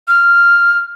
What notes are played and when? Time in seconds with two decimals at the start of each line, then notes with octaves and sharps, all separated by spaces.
0.08 F6